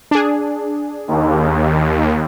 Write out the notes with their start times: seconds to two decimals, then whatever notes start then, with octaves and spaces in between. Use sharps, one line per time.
0.11 D4 G#4
1.08 D#2